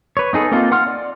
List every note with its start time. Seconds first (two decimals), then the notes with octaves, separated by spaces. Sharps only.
0.17 B4 C#5
0.33 B3 D#4 G#4 A4
0.52 A#3 C4 D#4 F4 A4
0.72 F#5 C6 F6
0.87 D5